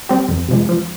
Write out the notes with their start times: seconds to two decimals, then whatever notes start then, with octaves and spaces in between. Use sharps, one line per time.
0.09 G3 C4 G4
0.29 F2
0.49 C3 F3 G#3
0.69 F3